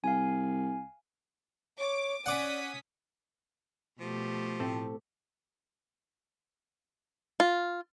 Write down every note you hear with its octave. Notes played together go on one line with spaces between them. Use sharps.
C2 F5 G#5
C#5 D6
C#4 D5 F#5 D6 D#6 B6
B2 F3 A3 G4
A2 C4 A4
F4